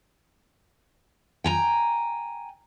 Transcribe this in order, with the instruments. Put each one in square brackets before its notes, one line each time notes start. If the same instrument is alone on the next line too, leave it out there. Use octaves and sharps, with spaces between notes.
[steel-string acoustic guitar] G5 G#5 A#5